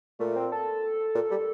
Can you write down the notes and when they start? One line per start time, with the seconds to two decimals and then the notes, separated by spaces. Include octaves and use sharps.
0.20 A#2 A3
0.36 C4
0.52 A4
1.15 A#2
1.31 G3